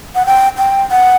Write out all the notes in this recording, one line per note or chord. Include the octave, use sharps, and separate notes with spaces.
F#5
G5
G5
F#5